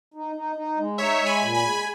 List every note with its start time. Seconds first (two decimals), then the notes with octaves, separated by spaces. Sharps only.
0.14 D#4
0.35 D#4
0.56 D#4
0.77 G#3
0.98 D#4 C#5 E5
1.20 G#3
1.26 G#5 B5
1.41 A#2
1.54 G#5 B5
1.62 G#3